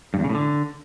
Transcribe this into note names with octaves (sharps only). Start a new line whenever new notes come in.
G2
E2
C#3
A2
D3